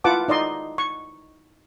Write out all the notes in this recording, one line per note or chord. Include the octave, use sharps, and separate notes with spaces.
E4 F4 B4 F#5 A5 D6
D#4 D5 D#5 C6
C#6